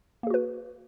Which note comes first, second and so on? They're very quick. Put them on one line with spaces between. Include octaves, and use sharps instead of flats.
A#3 G#4 F#4 B4